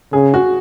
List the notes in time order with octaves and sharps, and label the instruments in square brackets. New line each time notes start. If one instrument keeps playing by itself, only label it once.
[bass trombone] C#3 [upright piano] G#4
[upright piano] F#4